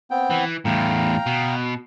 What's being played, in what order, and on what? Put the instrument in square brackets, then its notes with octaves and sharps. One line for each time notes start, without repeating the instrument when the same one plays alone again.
[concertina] B3 C4 G5
[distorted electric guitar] E3
[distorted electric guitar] E2 A2 [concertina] F5 G5 A#5
[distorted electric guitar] B2